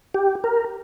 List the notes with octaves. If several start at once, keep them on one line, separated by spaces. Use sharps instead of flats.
G4
A#4